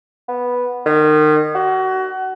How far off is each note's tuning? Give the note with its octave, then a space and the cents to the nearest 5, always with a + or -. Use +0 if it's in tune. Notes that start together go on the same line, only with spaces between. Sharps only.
B3 -5
D#3 -30
F#4 +30